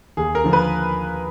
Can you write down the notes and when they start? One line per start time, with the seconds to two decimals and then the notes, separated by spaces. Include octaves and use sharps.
0.17 D#2 G#4
0.35 A#4
0.44 D3 F3
0.53 B4